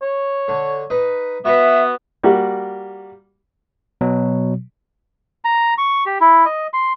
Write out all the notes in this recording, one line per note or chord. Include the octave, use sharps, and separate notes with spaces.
C#5
D3
D#4 B4
B3 F#4 B4 E5
G3 A#3 F#4
B2 F#3
A#5
C#6
G4
E4
D#5
C6